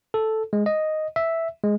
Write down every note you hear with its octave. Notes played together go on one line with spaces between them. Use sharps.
A4
G#3
D#5
E5
G#3